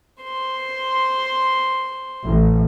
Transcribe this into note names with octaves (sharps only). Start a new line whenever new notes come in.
C5 C6
A1